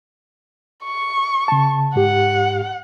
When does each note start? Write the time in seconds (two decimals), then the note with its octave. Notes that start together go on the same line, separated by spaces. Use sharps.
0.85 C#6
1.48 C#3 A5
1.96 G#2 G4 F#5